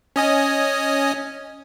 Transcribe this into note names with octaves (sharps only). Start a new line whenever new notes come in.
C#4 D#5 G#5